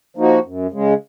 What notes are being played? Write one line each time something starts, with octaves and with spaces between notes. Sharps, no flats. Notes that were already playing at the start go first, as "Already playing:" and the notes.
F3 A#3 D#4 F#4
F#2
C#3 G#3